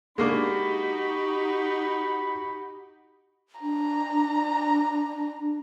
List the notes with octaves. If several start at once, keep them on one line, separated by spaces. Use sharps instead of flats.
G#3 A#3 D4 D#4 F#4 G4 B5
D4 A#5